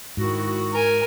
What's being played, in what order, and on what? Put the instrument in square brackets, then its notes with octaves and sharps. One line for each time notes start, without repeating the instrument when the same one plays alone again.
[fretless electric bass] G#2 [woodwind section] D#3 E4 F#4
[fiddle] A#4 G#5